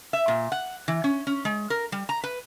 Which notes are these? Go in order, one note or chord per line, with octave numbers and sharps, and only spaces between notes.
E5
A#2
F#5
E3
C#4
C#4
G#3
A#4
G3
A#5
B4